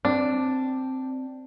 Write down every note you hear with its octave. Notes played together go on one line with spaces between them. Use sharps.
C4 D4